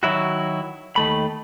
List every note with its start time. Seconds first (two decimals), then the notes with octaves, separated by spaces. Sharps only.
0.03 D#3 F#3 E4 F#4
0.96 D#2 D#3 A3 B5